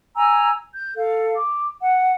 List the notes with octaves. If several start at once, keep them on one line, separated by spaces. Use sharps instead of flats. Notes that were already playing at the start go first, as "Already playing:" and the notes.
G#5 A#5 E6
G6
A4 F5
D6
F#5